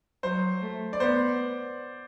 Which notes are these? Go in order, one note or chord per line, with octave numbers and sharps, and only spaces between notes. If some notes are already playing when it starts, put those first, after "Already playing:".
F#3 C5
A3
D5
B3 C5